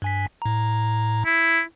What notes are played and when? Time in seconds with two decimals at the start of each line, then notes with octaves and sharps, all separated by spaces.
0.02 G2 G#5 B6
0.42 A2 A#5
1.25 E4